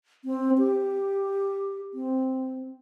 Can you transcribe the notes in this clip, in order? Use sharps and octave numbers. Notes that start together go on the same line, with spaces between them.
C4
G4
C4